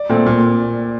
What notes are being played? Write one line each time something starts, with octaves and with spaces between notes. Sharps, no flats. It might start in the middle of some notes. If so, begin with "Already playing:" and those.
Already playing: D5
A#2 A3 C4
A#2